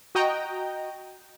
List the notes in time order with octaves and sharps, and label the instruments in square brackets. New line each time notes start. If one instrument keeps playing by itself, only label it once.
[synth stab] F#4 D#5 G5 A#5